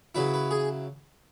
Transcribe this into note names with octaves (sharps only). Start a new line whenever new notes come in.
C#3 F#3 E4 B4
B4
G#4